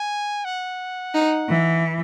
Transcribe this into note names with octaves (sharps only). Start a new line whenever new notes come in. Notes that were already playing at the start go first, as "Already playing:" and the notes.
Already playing: G#5
F#5
D#4
E3